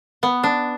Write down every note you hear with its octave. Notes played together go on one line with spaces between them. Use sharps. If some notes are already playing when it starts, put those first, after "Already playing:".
B3
D4